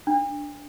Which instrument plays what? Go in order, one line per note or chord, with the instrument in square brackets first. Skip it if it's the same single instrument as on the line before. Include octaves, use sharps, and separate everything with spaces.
[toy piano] D4